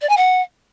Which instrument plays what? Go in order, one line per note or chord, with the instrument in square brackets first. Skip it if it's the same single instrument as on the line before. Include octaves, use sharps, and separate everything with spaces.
[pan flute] D5
G#5
F#5